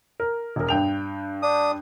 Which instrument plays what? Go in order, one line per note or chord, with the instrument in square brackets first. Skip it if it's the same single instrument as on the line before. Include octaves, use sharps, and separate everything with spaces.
[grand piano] A#4
E1 A#4
G2 G5 F7
[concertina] D4 D#6